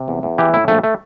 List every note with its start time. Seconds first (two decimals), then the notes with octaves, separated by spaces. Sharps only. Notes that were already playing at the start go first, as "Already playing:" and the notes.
Already playing: C3
0.08 E2
0.23 E2
0.38 E3 G4
0.53 A2 E4
0.68 A#1 A3
0.84 A3